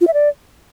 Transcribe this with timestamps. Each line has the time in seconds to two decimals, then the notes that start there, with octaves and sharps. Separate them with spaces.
0.01 F4
0.07 E5
0.14 D5